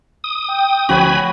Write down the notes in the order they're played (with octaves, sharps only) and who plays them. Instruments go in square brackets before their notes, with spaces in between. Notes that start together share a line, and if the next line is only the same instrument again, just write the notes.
[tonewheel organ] D#6
[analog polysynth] G5
[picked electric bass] D2 F3 C#4 [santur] F#4 B4 C#5 [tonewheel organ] G#5 B5